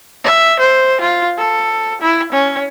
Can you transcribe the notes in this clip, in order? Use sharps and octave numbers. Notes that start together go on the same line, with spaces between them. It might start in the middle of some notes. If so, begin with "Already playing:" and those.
E5
C5
F4
A4
E4
C#4